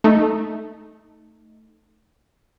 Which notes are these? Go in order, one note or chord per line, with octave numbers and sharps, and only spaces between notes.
A3 D#4